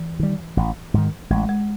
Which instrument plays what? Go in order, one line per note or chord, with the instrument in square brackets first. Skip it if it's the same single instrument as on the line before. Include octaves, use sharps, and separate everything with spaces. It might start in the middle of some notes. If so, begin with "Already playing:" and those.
Already playing: [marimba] E3
[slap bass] D#3 G3
A1
G#2 D#3
[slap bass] A1 [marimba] G#3
[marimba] G#3